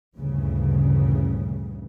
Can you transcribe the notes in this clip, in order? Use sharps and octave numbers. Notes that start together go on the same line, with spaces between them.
D2 G2 A#2 C#3 E3